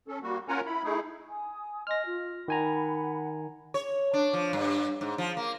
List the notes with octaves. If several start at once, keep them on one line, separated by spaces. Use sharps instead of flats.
C#4 A4
G3 A#3 F#4
C#4 F4 A#4 F#5 G#5 A#5
E4 B5
A3 D#4 E4 G#4
G#5 D#6
D#5 G#5 C6 F6 A#6
F4
D#3 F#5 G#5 A#5 B5
C#5
D4
F3
G2
G#2
F3
A#3